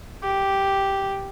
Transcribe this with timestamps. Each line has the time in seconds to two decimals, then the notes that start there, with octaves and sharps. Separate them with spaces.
0.23 G4